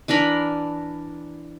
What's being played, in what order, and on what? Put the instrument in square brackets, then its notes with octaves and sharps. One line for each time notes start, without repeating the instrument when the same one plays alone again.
[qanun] E3 D4 A#4 B5